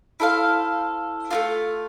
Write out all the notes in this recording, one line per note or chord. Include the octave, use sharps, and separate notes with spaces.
E4 A4 C5 F5
A3 C4 F4